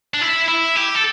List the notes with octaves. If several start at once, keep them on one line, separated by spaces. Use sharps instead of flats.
D4
E4
E4
G4
A4